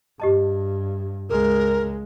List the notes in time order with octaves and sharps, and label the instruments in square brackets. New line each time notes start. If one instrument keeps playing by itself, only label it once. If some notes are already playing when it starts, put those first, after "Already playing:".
[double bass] G2 [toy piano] G4 D#5 A5
[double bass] C#2 G#3 [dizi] A#4